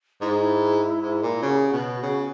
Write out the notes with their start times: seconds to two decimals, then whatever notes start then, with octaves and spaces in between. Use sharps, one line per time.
0.21 G#2 E4
0.30 D#4
0.40 E4
1.02 G#2
1.22 A#2
1.42 C#3 F#4
1.55 G#4
1.68 F#4
1.73 B2
2.03 C#3